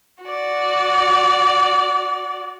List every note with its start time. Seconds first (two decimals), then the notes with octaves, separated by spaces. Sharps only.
0.24 F#4 D5